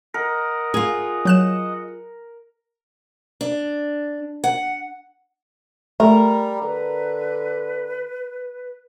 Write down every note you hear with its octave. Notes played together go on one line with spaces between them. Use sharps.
A#4 D#5 F#5
F4 G#4
F#3 F#6 E7
D4
F#5
G3 A3 A#4
D3 B4